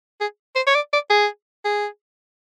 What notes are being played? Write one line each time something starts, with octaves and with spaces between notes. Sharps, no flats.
G#4
C5
C#5
D5
D5
G#4
G#4